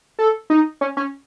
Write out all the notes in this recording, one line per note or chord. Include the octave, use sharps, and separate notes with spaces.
A4
D#4
C#4
C#4